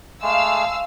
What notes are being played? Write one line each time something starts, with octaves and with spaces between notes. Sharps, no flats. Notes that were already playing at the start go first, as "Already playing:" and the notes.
G#3 A3 F5 E6